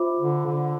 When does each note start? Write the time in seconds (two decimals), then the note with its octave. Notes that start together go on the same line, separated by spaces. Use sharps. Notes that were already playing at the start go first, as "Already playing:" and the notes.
Already playing: F4 C5 E5 B5 D6
0.19 D3
0.46 D3